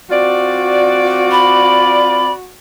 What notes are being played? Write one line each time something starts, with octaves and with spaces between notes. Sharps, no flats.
C4 F4 F#4 D5
B5